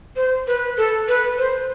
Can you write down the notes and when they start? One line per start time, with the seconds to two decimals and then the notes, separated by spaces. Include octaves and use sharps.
0.16 C5
0.47 B4
0.78 A4
1.08 B4
1.38 C5